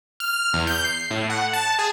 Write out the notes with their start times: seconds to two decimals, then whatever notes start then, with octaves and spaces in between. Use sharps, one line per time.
0.20 F6
0.53 E2
0.67 G6
0.84 C7
1.10 A2
1.30 F#5
1.53 A5
1.79 G#4